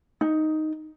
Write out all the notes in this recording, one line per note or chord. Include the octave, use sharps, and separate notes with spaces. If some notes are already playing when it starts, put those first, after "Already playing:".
D#4